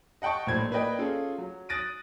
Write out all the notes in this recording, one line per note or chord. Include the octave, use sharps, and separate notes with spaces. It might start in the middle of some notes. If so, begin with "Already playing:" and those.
D#5 F#5 G5 A5 C#6
A#1 A2 F#3 C5 G#6
A#3 B4 D5 D#5 G5
C#4 F4 G#4 A4
F#3
D#6 F#6 A6 A#6 D7 D#7